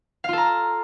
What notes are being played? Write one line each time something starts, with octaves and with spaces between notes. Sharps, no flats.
F4 A4 F5 A#5